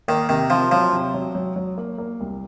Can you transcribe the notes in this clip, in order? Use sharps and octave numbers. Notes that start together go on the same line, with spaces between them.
D#3 A#3
C3 D#3
C3 F3
F3 F#3
C3
F#3
F#3
F#3
A#3
A#3
C2